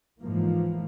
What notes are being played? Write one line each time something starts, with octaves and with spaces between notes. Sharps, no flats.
G#2 E3 F3 A#3